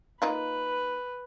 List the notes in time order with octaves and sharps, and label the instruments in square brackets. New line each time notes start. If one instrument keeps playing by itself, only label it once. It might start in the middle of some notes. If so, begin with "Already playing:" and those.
[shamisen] A#3 D#4 F4 [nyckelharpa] B4